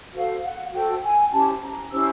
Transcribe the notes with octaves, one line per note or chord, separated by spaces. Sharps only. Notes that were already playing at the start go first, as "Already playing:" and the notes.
F#4 A4 C5 F5
F#5
F#4 A4 C5 G5
G#5
C#4 E4 G4 C5 A5
A#5
C#4 E4 G4 C5 E6